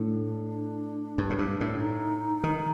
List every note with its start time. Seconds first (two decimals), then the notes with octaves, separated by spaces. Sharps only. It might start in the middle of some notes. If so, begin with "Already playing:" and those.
Already playing: A2 D4
1.18 G2
1.30 A2
1.39 G2
1.61 A2
1.81 D#4
2.44 D#3